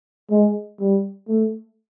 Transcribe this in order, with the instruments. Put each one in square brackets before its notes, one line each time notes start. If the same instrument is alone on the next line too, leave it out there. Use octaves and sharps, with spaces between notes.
[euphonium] G#3
G3
A3